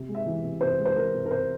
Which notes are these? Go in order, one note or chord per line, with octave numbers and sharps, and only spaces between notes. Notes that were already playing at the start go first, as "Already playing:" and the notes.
Already playing: C3
G#3
E5
E3
C3
C3 C5
G#3
C5
E3 A#4
C3
A#4
C3 C5